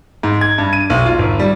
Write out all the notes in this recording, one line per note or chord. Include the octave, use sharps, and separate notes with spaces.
G#2
G#6
G2
D#7
B1
F4
G#1
G3